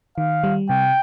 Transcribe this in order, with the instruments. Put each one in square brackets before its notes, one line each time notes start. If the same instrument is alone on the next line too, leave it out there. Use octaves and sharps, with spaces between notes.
[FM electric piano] D#3 [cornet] F5
[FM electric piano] G3
[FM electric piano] C3 [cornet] G5